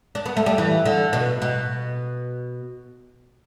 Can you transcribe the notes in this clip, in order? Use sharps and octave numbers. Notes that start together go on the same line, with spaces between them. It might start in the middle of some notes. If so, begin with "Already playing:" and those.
D4
B3
A3
G3
E3
D3
B2
B2